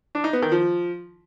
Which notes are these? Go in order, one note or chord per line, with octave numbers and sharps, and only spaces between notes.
D4
D#4
B3
D#3
F3